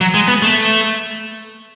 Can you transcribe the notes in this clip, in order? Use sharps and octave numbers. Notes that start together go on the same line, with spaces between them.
F#3
G#3
B3
A3